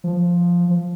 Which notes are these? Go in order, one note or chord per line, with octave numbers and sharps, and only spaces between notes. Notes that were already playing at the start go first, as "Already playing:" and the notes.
F3